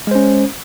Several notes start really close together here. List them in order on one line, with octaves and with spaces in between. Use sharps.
G#3 C5 C#4